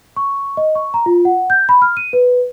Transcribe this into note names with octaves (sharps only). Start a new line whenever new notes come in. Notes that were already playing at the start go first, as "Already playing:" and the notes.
C#6
D#5
C#6
A#5
F4
F#5
G6
B5
F6
D#7
B4